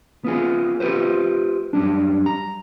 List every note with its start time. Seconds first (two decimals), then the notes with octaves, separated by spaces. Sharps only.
0.24 B3 F4 G#4
0.80 F4 G4 A4 B4 C5
1.73 F#2 G3 D4
2.26 A#5